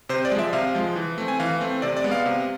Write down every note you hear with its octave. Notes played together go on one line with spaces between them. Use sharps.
C3 C5
D5
F3 G#3
E5
C3 F5
F3 G#3
E3
A3 C4
G#5
E3 F5
A3 C4
C3 D5
D5
G#3 B3
F5
C3